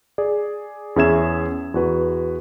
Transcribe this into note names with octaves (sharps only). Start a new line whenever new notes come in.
G#4 D5
E2 C#4 G#4 E5 G#6 E7
E2 F#4 B4